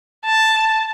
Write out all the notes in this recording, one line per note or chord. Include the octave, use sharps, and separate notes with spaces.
A5